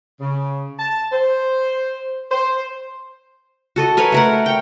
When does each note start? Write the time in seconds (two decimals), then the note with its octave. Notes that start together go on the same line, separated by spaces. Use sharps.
0.20 C#3
0.79 A5
1.12 C5
2.31 C5
3.76 F#4 A4 D#5
3.97 A#4 B4 C#5 G#5
4.12 A3 A#4 F#5
4.46 C#5 G5